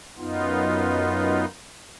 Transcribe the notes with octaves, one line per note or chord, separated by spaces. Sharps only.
F#2 B3 D#4 F4